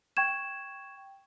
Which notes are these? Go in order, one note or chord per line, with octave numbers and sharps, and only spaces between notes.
G5 C#6 G#6 E7